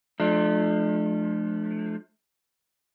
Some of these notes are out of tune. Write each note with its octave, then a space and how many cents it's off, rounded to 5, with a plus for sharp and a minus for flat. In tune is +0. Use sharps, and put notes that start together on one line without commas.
F3 +5 A3 -30 D4 +35